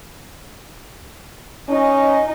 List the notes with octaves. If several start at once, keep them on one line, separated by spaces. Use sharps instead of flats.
C#4 D#4 D#5